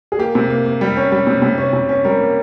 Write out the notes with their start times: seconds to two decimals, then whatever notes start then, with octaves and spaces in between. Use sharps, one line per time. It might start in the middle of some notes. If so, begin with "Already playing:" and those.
0.12 G#4
0.19 A#3 G4
0.35 C3
0.50 A#3
0.66 A#3
0.81 G3
0.97 C#4
1.12 G3
1.27 C3
1.42 C3
1.58 C#4
1.73 C3
1.89 C#4
2.04 G3 A#4
2.20 A#3